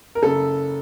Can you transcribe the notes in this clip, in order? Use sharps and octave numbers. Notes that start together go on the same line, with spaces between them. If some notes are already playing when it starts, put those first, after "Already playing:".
A#4
F#1 C#3 A4